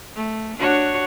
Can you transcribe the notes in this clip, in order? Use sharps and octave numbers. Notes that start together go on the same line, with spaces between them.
A3
D4 F#4 C#5